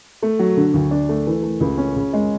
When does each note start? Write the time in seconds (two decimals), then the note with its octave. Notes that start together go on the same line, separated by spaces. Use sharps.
0.23 A3
0.39 F#3
0.57 D3
0.74 D2
0.91 D4
1.09 A3
1.27 E3
1.43 A3
1.60 C#2
1.78 C#4
1.96 C#3
2.13 G#3